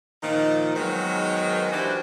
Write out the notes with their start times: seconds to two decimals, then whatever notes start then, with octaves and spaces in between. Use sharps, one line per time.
0.22 A#2 D#3 F3 D#4
0.76 D#3 F#3 G#3 B3 G#4 C5
1.72 E3 D4 F#4 G4 C5